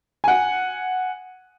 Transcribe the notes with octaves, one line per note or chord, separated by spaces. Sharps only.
F#5 G#5